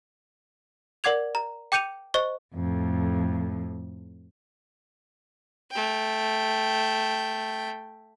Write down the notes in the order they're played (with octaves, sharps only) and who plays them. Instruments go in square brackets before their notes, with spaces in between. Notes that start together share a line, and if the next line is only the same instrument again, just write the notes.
[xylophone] A#4 D5 F#5 D6 G#6 F7
A#5
G5 D6 G6 C#7 D#7 F7
C5 D#5 C#6 G7
[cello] F2 A2
[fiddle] A3 G5